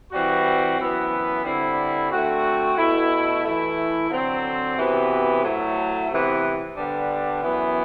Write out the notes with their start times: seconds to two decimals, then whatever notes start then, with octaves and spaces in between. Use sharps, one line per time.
0.12 E3 G3 C4 F#4
0.78 F#2 E3 B3 E4
1.44 D3 G3 C4 E4
2.11 D3 A3 C4 F#4
2.77 B2 A3 E4
3.45 E3 A3 E4
4.10 D3 F#3 C4
4.77 C3 E3 B3 F#4
5.43 A2 F#3 A3
6.10 C3 E3 B3
6.77 D3 G3 B3 D4
7.43 F#2 E3 B3